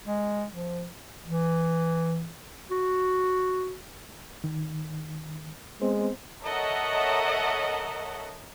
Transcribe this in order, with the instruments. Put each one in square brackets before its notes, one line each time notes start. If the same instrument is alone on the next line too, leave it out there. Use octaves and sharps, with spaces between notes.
[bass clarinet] G#3
F3
[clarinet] E3
F#4
[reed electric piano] D#3
[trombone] G#3 [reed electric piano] B3 C4 C5
[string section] A4 A#4 C#5 D#5 E5 F#5